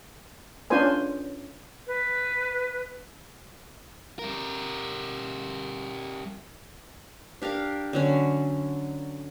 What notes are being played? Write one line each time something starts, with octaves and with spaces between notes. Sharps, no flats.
C#4 D4 F4 B4 C5 G#5
B4
G3 A#4
D4 G4 A#4 F5
D3 F#3 C#4